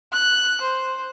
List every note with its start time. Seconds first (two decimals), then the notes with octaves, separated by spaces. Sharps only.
0.12 F#6
0.61 C5